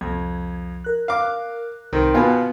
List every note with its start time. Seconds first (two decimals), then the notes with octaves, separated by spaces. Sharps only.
0.01 C2 F2 G#6
0.84 A#4 F#6
1.08 F5 D6
1.93 C2 D#3 C4
2.14 B2 B3 F4 G5 G#5 G#6